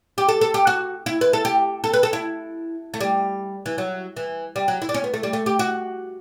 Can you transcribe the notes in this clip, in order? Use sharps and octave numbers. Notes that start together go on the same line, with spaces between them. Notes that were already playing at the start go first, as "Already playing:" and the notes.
G4
A4
A4
G4
F#4
E4
B4
A4
G4
A4
B4
A4
E4
A3
G3
E3
F#3
E3
G3
F#3
E4
D4
C#4
B3
A3
G3
A3
G4
F#4